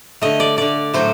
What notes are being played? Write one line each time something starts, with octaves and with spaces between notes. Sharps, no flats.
D3 A3 D#5
D5
D3 A3 D5
A2 F#3 A3 C5